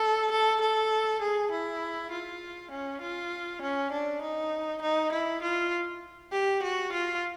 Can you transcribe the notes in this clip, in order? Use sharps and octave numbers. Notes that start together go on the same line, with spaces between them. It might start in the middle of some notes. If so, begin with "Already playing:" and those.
Already playing: A4
A4
A4
G#4
E4
F4
C#4
F4
C#4
D4
D#4
D#4
E4
F4
G4
F#4
F4